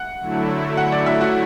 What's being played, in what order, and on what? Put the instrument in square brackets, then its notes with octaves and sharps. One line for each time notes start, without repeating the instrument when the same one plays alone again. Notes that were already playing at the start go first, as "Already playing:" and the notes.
Already playing: [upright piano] F#5
[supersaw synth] D3 F#3 A3 E4
[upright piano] F#5
D5
E5
F#4